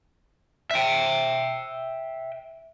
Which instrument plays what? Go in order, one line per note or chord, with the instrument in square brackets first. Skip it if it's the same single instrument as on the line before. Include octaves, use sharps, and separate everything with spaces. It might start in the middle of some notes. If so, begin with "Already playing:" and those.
[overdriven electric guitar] E5 G5